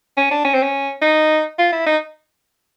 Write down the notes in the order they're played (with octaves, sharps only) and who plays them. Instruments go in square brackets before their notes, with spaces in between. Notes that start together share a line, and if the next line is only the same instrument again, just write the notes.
[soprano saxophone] C#4
D4
C#4
C4
C#4
D#4
F4
E4
D#4